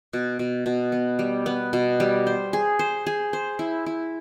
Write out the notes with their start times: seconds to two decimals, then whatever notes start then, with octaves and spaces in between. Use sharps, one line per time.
0.13 B2
0.39 B2
0.66 B2
0.92 B3
1.19 G3
1.46 B3
1.73 B2
2.00 G3
2.27 C5
2.53 G#4
2.79 C5
3.06 G#4
3.33 C5
3.59 E4
3.86 E4